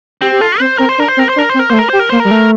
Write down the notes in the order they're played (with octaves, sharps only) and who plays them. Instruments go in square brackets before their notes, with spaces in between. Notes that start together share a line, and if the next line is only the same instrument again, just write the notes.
[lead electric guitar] C4 [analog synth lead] G4
[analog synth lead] G4
[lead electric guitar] F4 [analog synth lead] A4
[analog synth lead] C4 [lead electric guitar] C5
[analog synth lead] C4 [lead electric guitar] A#4
[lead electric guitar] C5
[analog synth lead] D4 [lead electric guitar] A#4
[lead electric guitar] C5
[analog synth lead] C4 [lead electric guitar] A#4
[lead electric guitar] C5
[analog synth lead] D4 [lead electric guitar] A#4
[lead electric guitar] C5
[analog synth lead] C4
[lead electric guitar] A#4
[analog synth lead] A3 A#3 [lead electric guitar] C5
[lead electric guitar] A#4
[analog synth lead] G4 [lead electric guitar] C5
[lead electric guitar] A#4
[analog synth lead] A#3 [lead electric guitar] C5
[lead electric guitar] A#4
[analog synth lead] G3
A3